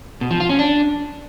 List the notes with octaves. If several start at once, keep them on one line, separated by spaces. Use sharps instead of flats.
B2
F3
F4
C#4
D4